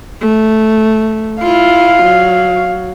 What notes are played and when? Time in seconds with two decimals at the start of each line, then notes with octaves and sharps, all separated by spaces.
0.21 A3
1.42 E4 F4 F5
2.03 F#3